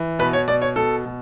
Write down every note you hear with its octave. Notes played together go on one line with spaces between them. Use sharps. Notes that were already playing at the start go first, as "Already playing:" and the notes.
Already playing: E3
B2 B4
C#5
B2 D5
C#5
B2 A4
B2